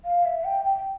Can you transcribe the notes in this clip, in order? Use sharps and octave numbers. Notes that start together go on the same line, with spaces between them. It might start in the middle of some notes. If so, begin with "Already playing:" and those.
F5
E5
G5
G5